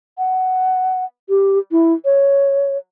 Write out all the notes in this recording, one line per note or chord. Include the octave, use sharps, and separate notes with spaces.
F#5
G4
E4
C#5